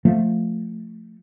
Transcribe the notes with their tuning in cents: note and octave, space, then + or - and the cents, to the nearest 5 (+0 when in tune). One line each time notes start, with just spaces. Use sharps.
F3 +10 A3 +5